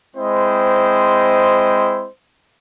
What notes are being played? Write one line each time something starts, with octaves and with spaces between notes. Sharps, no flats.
G#3 C4 E4 C5 D#5